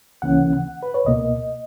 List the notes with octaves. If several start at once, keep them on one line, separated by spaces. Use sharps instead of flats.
C#2 C#3 E3 A#3 C#4 F#5
B4
C#5
C#2 B2 A#3 D#5